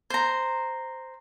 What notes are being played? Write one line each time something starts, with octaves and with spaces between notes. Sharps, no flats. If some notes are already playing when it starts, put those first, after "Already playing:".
C5 A#5